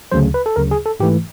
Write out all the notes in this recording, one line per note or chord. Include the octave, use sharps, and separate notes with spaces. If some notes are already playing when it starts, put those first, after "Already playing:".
D2 C#3 F#3 C5
B4
A4
D2 C#3 F#3 A#4
G#4
A4
G#2 E3 A3 G4